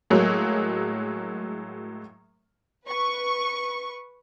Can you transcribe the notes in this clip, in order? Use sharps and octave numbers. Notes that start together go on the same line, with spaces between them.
A2 F#3 G#3 A#3
B4 C#6